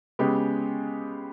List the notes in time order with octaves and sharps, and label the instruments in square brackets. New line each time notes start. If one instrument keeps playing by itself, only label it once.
[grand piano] C#3 G#3 B3 G4